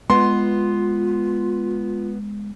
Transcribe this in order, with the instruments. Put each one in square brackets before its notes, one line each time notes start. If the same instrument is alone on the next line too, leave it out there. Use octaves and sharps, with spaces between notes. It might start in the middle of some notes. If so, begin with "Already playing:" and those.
[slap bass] G#3 [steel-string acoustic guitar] B3 [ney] F4 [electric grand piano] C6